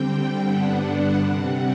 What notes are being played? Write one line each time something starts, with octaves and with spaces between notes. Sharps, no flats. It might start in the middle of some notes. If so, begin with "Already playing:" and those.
Already playing: D3 G3 C4 G5
G2 D3 G3 B3 D4 F#5
C3 G3 C4